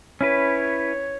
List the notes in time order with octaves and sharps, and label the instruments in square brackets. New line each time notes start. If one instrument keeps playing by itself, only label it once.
[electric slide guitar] C#4 E4 B4 [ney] C#5